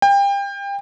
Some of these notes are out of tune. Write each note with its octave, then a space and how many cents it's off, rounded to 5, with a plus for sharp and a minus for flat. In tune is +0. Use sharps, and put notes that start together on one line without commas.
G5 +30